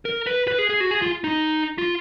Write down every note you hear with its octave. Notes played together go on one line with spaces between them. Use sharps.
A#4
B4
B4
G#4
G#4
F#4
G#4
F4
D#4
F4